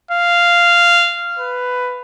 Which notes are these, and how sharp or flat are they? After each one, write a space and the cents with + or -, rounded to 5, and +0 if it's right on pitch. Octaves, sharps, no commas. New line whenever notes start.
F5 -10
B4 +10